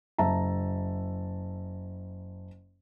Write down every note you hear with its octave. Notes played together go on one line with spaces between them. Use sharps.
F#1 E5 A5 A#5